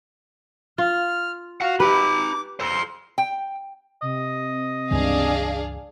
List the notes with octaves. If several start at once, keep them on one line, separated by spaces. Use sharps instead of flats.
F4 F6
F#4 F5 F#5
D#4 G4 B4 B5 D6
A4 C5 C6
G5
C3 D#5
C#2 G2 E3 D4 G#4 F5